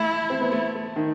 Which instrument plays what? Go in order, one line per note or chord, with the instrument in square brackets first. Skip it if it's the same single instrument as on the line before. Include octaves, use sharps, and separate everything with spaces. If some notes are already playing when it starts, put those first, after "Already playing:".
Already playing: [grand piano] A3 [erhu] E4
[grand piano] C4
B3
A3
A3
D#3